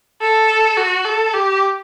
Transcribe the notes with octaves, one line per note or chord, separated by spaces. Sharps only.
A4
F#4
A4
G4